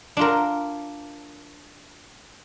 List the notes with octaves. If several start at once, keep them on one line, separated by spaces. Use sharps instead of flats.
D4 F4 A#4